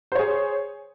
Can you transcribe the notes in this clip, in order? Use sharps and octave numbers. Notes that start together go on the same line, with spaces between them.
G#4 C5 C#5